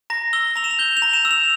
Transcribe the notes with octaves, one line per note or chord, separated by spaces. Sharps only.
A#5 A#6
E6 G7
A#5 F7
E7
F7
G6 G7
F7
A#5
E7
E6
F7